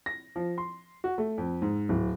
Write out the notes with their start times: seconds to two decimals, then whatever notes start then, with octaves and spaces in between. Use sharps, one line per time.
0.06 A#6
0.36 F3
0.58 C6
1.04 F#4
1.18 A3
1.38 F2
1.62 G#2
1.89 D1